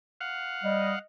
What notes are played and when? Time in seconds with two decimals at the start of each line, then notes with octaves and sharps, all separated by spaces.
0.21 F5 F#5
0.64 G3 D#5